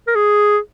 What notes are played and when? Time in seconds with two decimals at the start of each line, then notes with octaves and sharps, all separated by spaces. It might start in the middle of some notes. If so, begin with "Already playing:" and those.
0.08 A#4
0.15 G#4